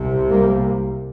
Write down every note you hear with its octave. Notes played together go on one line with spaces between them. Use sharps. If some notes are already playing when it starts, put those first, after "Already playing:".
Already playing: C2 C3
G3 A#3